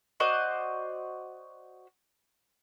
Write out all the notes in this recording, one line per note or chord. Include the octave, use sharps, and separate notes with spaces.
F#4 C5 D5 D#5